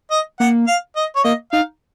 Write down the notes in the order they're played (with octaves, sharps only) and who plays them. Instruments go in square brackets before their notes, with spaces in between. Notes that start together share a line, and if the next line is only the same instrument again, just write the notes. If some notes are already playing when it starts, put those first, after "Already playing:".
[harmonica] D#5
[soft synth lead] A#3 [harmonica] F#5
[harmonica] F5
D#5
C#5
[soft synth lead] A#3 [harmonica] D#5
[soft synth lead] D#4 [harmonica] F5